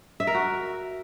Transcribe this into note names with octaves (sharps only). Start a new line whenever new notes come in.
E5
A#4
F#4